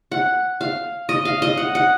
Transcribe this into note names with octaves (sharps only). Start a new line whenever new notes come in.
F#5
F5
D#5
F5
D#5
F#5
F#5